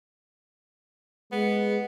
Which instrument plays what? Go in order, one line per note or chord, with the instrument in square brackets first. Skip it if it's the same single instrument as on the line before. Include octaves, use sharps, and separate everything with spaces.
[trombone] G#3 [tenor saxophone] B3